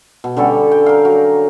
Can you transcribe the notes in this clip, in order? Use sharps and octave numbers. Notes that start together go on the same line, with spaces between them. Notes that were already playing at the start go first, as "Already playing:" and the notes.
B2
D3 G3 C#4 A4
G5
A#4 F5
F#3